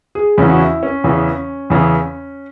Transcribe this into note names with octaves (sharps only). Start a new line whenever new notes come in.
G#4
E2 C#3 E3 C#4
F#4
E4
C#4
E2 C#3 E3
E2 C#3 E3